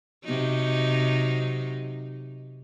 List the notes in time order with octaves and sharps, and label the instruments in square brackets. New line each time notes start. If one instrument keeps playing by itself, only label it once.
[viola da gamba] C3 F#3 D#4